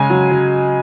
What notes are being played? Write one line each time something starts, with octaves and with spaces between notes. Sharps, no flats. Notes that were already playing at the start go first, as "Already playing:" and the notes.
Already playing: C#3 G#3 G#5
F#3
F#3